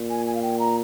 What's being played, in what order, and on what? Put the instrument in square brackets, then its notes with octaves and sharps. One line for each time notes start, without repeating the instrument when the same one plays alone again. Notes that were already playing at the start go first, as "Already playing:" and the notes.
Already playing: [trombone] A#2
[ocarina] G#5
G#5
F5
G5
A#5